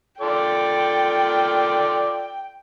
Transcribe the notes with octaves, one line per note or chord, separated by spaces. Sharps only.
F4 A4 D5 G5